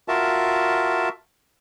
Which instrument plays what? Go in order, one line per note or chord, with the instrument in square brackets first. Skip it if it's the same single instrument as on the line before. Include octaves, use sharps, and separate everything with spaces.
[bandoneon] F4 F#4 A#4 E5 A5